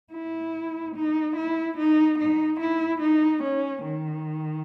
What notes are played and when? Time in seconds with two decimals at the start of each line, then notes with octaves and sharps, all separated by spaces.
0.13 E4
0.95 D#4
1.36 E4
1.78 D#4
2.19 D#4
2.60 E4
3.02 D#4
3.43 C#4
3.84 D#3